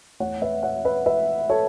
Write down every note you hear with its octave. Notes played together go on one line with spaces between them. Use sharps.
E2 E3 A3 C#5 F#5
B4 E5
C#5 F#5
B4 E5
B4 E5
A4 C#5